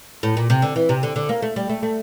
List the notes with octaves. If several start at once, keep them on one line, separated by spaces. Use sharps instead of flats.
A2
A#2
C3
D3
E3
C3
D3
D3
A#3
A3
G3
A3
A3